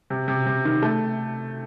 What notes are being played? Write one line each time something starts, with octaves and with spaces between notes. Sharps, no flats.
C3
C3
C3
D#3
A3